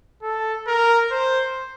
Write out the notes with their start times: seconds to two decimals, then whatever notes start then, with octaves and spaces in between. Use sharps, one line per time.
0.23 A4
0.67 A#4
1.11 C5